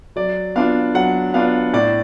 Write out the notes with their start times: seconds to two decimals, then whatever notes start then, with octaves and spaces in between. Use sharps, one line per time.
0.16 F#3 D5
0.55 B3 D4 F4 F5
0.94 F#3 F#5
1.34 B3 D4 F4 F5
1.73 A2 D5